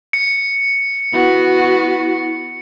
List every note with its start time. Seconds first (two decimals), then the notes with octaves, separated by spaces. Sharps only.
0.13 C#7
1.14 B3 E4 F#4